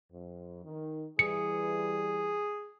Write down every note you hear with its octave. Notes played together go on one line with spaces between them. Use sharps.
F2
D#3
E3 G3 G#4 C#7